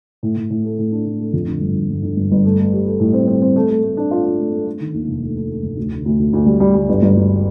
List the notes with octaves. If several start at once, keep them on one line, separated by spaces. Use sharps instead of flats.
A2
A2
A2
A3
A2
D4
A2
A3
F2
D3
G1
G1
G1
D3
G1
G1
A3
A3
G4
A3
A2
C4
C4
C4
A3
A3
A3
D4
F4
F4
A3
A3
A3
D#3
D#2
F1
A3
A3
A3
F1
D2
D3
D2
D2
D2
G3
G3
G3
G1
G1
G1